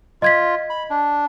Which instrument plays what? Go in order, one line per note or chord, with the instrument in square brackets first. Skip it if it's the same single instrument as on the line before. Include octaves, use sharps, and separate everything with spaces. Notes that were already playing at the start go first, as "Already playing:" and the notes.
[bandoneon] F4 [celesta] D#5 G#6 B6
[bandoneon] B5
D4